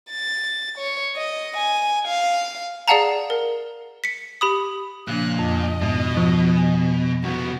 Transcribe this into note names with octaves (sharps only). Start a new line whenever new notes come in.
A6
C#5
D#5
G#5
F5
G#4 D5 F5 F#5 A5 A#5
A#4
B6 C#7
G4 B5 D#6
A#2 C#3 F3 D4 F#6
F2 D#5
G#2 B2
F3
G#5
C2 B3 F#4